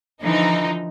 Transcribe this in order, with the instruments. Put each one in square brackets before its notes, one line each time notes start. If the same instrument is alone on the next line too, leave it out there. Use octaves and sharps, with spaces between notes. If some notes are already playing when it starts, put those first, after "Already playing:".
[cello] D3 E3 [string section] F3 D#4